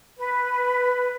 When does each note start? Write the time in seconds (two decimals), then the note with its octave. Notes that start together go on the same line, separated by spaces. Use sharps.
0.17 B4